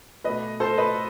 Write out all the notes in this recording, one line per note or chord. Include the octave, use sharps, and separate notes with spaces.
B2 A3 B4 D#5
A4 C5
B4 D#5